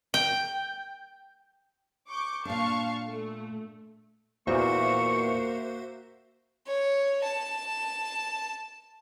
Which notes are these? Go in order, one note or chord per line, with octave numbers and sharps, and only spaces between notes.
G5
C#6 D6 G6
A#2 D4 F5 A5 C#6
A3
E2 A#2 A#3 F#4 C5 E5 C#6
C#5
A5